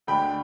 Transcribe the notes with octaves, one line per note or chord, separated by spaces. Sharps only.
D2 D3 G#3 D4 G5 B5